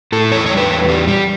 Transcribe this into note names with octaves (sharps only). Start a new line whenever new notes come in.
A2 A4
E2 C#5
G3 C#5
B4
E2
G3
G3